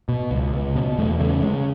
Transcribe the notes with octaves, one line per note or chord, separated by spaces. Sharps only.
B2
C#2
C#2
B2
E2 A3
C#3 A3
C#3 G#3